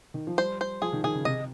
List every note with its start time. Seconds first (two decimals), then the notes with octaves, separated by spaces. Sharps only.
0.14 D#3
0.27 F3
0.38 G3 C5
0.61 C5
0.82 F3 G#4
0.93 D#3
1.04 D#3 G#4
1.15 C#3
1.25 C3 D#5